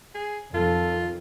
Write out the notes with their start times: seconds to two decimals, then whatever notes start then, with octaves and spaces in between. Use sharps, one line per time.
0.15 G#4
0.54 F2 D#3 F4 A4